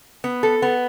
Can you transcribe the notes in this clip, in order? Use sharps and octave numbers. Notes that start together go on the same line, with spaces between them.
B3
A4
B3